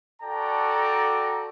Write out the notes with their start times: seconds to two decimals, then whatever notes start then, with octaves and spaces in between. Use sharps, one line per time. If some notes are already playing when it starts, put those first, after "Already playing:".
0.22 F#4 A4 D5 G5 A5 A#5